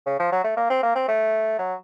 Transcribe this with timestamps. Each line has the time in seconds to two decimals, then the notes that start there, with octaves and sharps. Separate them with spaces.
0.06 C#3
0.19 F3
0.32 F#3
0.44 A3
0.57 A#3
0.70 C4
0.83 A#3
0.95 C4
1.08 A3
1.59 F#3